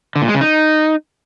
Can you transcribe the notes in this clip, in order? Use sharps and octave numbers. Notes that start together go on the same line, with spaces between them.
D3
A#2
G#3
C#3
D#4